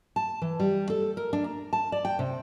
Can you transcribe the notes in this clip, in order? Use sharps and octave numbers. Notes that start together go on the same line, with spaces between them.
A5
E3
G3
A4
A#4
D4
A#5
A5
D5
G5
C3